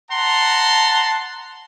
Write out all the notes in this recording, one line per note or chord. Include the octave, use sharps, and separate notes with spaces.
F#5 A5 A#5 C6